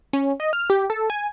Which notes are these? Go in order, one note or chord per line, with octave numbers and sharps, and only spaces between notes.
C#4
D#5
F6
G4
A4
G#5